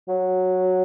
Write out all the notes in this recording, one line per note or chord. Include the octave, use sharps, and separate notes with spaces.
F#3